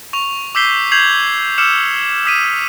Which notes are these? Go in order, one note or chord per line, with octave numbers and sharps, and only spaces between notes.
C#6 F7
D6 E6 G6 B6 C7 G7
G6 G#6 C7 F7 F#7
D6 E6 F6 C#7 E7
D#6 B6 D#7